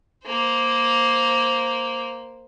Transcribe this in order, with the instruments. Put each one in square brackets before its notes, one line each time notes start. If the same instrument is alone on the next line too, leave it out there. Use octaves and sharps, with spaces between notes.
[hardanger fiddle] A#3 C5